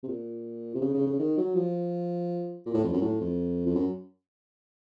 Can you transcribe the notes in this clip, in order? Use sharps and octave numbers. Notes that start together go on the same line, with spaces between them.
C3
A#2
C3
C#3
C#3
C#3
D#3
F#3
F3
A#2
A2
F2
F#2
A2
F2
F2
F#2